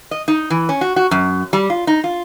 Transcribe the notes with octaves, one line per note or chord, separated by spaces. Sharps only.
D#5
D#4
E3
C#4
F#4
F#4
F#2
G3
F4
D#4
F4